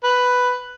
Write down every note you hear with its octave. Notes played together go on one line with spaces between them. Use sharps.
B4